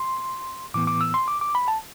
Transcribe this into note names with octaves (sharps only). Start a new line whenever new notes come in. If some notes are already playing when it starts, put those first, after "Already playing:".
Already playing: C6
A2 E3 B3 D6
D6
E6
C6
D6
D6
B5
A5